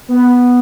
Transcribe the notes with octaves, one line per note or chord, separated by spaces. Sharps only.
B3